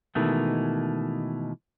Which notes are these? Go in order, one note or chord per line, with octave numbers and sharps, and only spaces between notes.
B2 D#3 E3 G#3 A3